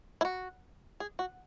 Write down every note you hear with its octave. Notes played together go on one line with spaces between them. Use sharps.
E4
F#4
G#4
F#4